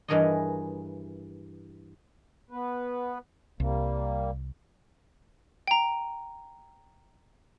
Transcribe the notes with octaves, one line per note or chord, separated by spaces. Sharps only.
G2 E3 G#4 A#4 C#5 D#5
B3 B4
C2 G3 A#3
G5 A#5